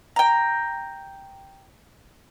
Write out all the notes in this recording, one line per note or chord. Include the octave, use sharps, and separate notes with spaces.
G5 A#5